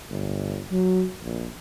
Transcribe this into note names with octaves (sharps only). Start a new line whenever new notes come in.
G1
F#3
A#1